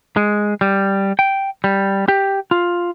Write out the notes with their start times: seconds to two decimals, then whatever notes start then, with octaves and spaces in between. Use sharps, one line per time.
0.17 G#3
0.61 G3
1.19 G5
1.64 G3
2.08 G4
2.51 F4